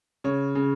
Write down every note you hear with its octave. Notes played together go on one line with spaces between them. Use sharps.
C#3 C#5
C#3